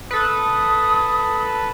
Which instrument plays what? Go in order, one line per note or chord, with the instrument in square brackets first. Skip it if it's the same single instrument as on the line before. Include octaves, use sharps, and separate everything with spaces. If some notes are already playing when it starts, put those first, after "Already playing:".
[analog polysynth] A4 B4 [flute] D#6